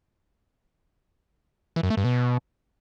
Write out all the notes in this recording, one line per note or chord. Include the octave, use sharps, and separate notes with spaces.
E3
F#2
A3
G2
B2